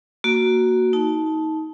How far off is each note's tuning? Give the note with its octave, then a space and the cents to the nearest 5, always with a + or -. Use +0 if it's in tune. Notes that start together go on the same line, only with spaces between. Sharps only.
A#3 +0 F#4 +0
D#4 +25 A5 -10